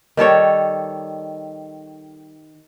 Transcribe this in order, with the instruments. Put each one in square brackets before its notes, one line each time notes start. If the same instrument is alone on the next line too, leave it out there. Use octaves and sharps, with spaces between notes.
[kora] D#3 G3 A4 C#5